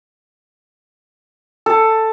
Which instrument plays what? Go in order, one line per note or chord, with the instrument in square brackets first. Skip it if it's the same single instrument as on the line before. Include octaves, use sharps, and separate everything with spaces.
[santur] A4